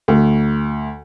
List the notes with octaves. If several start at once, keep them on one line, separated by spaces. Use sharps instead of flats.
D2